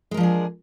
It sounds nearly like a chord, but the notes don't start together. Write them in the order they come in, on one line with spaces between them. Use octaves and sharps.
G#3 A#4 F3 D4 G#4